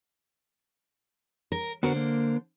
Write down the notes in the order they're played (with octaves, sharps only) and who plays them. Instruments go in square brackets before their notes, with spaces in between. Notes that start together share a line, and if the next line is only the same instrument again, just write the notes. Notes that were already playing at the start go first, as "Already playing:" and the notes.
[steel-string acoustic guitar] A#4
[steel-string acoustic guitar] D3 C5 [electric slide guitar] B3 F#4 A#4
[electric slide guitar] A#3